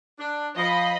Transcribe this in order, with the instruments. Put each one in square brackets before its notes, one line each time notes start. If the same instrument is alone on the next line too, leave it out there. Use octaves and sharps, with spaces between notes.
[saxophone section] D4
[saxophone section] F3 [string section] D#5 B5